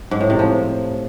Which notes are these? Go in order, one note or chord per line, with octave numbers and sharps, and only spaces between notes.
G#2
A2
C3
F3